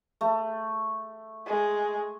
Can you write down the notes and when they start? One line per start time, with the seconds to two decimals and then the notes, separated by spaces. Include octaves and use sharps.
0.21 A3
1.46 G#3